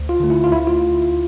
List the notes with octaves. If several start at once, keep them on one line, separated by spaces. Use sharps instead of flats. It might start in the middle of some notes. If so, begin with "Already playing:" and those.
Already playing: D2
F4
D3 A3
E4
F4
D2 E4
F4